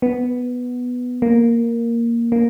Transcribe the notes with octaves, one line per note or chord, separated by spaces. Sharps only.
B3
A#3
A#3